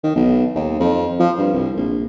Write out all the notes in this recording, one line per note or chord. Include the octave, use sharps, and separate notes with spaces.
D#3
B1
D#2
F2
F3
G2
C2
A#1